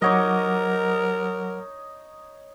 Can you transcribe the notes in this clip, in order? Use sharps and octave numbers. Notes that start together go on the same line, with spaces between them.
F#3 D#4 A#4 C#5 D#5 F#5 D6